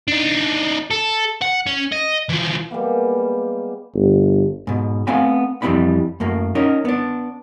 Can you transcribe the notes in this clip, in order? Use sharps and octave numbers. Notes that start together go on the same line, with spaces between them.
D4 D#4
A4
F#5
C#4
D#5
E3 F3
G3 G#3 A#3 B3
G1
G#2 B2
A3 B3 C4 F5 G#5 B5
F2 E3 G3 C4 D4 B5
F#2 A3 A#3
C#4 D#4 A#4
B3 D4